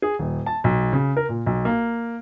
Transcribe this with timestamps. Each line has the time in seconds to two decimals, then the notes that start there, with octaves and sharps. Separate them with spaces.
0.02 G#4
0.19 D#1
0.46 A5
0.64 B1
0.93 C#3
1.17 A#4
1.29 A#2
1.46 B1
1.65 A#3